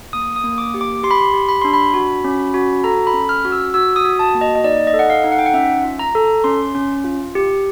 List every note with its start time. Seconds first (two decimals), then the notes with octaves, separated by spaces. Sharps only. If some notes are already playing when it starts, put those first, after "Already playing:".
0.13 A#3 D#6
0.36 D#6
0.44 A#3
0.58 D6
0.74 G4
0.81 D6
1.03 G4 C6
1.11 B5
1.18 C6
1.33 G4
1.49 B5
1.62 D4 C6
1.74 B5
1.94 F#4
2.24 C#4
2.54 F#4
2.84 A4 A#5
3.07 B5
3.13 C#4
3.29 F6
3.45 F#4
3.52 E6
3.74 F#4 E6
3.96 D#6
4.04 F#4
4.19 A5
4.34 A#3
4.41 D#5
4.56 D#5
4.64 D#4 D5
4.87 D#5
4.94 A4
4.99 F#5
5.10 F5
5.24 D#4
5.32 F#5
5.39 G5
5.46 F#5
5.54 C#4 E5
5.84 F4
5.99 A#5
6.15 A4
6.44 C#4 C6
6.75 C#4
7.04 F4
7.35 G4